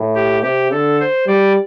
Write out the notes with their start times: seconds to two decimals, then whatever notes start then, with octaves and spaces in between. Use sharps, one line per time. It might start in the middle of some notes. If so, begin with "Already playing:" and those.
Already playing: A2
0.15 G4
0.43 C3 G4
0.71 D3 A4
1.00 C5
1.27 G3 D5